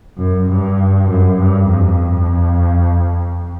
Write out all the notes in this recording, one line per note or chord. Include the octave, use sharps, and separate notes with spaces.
F#2
G2
F#2
G2
F2